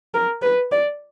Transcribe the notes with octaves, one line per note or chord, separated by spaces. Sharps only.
A#4
B4
D5